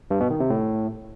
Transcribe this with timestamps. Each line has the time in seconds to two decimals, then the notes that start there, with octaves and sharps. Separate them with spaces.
0.11 G2
0.20 B2
0.30 D#3
0.40 C3
0.50 A2